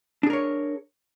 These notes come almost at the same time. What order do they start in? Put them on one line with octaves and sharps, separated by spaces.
D4 G#4 A#4 C#5